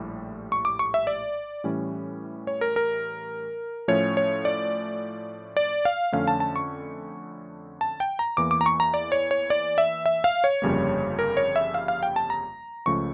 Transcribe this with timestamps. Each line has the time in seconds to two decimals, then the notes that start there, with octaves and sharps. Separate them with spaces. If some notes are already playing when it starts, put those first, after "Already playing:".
Already playing: A#1 A2 G3
0.52 C#6
0.65 D6
0.79 C#6
0.94 E5
1.07 D5
1.64 A2 E3 G3 C#4
2.47 C#5
2.61 A#4
2.76 A#4
3.88 A2 F3 A3 C#4 C#5
4.17 C#5
4.45 D5
5.57 D5
5.85 F5
6.12 F2 D3 A3 C#4 F5
6.27 A5
6.40 A5
6.56 C#6
7.81 A5
8.00 G5
8.19 A#5
8.37 E2 E3 A#3 D6
8.51 D6
8.61 A#5
8.66 C#6
8.80 A#5
8.94 D5
9.12 C#5
9.31 C#5
9.50 D5
9.78 E5
10.06 E5
10.24 F5
10.44 C#5
10.62 G1 F2 C#3 G3 A#3
11.19 A#4
11.37 C#5
11.56 E5
11.74 F5
11.88 F5
12.03 G5
12.16 A5
12.30 A#5
12.86 C#2 C#3 F3 A3 C#4 C#6